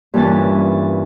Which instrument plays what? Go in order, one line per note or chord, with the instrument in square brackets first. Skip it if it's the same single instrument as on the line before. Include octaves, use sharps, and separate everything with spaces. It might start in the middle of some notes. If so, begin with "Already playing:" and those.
[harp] G2 A#2 E3 C#4 A5